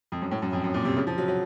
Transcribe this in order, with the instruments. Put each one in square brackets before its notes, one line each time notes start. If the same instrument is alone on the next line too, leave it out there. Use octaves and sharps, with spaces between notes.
[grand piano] F2
F#2
A2
F#2
F2
F#2
A#2
C3
C#3
F3
F#3
F#3